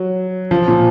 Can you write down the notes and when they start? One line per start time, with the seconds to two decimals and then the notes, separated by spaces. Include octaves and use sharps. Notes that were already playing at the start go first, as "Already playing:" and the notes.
Already playing: F#3
0.51 F3
0.68 A#2